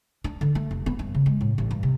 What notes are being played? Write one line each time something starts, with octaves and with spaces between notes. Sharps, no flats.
D4
D3
A3
F1
B3
G2
C#3
G#3
A2
A1
G2
C3